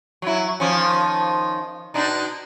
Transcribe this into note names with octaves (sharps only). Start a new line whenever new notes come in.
F#3 E4
D#3 F3 C#4
B2 D4 D#4